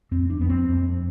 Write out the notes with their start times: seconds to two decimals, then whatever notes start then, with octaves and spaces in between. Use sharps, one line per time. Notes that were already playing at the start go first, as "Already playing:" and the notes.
0.11 F2 C4
0.30 D4
0.39 F2 B3
0.49 C4
0.68 F2